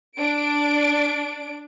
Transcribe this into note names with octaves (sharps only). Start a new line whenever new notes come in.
D4 D7